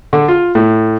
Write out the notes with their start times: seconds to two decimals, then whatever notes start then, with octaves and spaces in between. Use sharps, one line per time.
0.13 D3
0.28 F4
0.55 A2